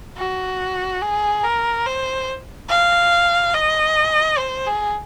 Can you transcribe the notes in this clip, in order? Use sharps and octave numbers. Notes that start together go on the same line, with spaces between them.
F#4
G#4
A#4
C5
F5
D#5
C5
G#4